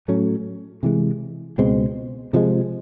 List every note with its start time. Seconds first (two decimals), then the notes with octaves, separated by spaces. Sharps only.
0.08 A2 F#3 A3 C#4
0.83 C3 E3 G#3
1.58 C#2 B2 G#3 C4
2.33 C3 F3 G#3